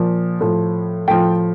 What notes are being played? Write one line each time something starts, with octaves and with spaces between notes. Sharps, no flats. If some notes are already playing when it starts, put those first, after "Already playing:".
Already playing: A#2 F3
A2 F3
A2 F3 G5